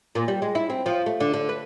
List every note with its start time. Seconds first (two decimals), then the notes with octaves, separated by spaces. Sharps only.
0.15 A#2
0.28 G3
0.42 G#3
0.55 E4
0.70 C4
0.86 F3
1.06 A3
1.20 D3
1.33 D3
1.49 B4